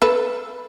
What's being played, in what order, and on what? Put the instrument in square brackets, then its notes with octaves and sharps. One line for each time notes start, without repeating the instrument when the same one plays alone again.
[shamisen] A4 B4